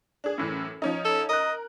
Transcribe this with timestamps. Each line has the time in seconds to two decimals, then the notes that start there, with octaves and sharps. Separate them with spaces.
0.24 D4 G#4
0.38 F#2 A2 E3
0.82 F3 C#4 D#4
1.05 A4
1.29 A#4 D#5 F#6